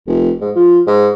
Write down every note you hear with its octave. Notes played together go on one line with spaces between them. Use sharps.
F1
G#2
F3
G#2